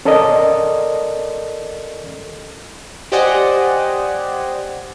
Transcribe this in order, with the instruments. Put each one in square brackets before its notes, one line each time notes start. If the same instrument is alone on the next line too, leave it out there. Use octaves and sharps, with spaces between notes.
[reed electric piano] C#4 A4 A#4 D5 D#5
[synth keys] G4 C5 D5 D#5 F#5 G#5